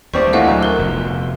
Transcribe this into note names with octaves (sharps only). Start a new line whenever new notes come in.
D2 G3 C4 D5 C#6
A#1 E3 A3 D#5 F5 F#5
E2 F#3
A#4 G7
F1